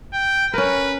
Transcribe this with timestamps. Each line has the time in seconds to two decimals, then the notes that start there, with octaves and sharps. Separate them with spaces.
0.14 G5
0.54 C#4 A#4 B4